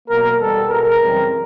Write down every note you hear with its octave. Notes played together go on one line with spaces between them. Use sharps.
B2 F#3 A#3 A#4
E2 B2 G3 B3 A4
B2 G#3 B3 A#4
F#2 C#3 E3 G3 C4